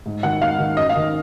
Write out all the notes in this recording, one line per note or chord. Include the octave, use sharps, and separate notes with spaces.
G#2
D#3 F#5
G#2 F5
D#3
F#2 D#5
F5
D#3